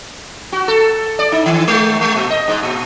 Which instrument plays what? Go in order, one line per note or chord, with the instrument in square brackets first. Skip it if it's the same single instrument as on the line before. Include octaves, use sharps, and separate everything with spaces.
[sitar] F#4
A4
D5
D#4
D#3
G#3
G#3
A#2
D#5
G#2
A#2